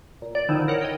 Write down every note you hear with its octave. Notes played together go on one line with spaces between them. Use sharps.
A#2
D5
D3 D#3 F3 D#4 E4
A#4 C#5 F#5
D#5 G5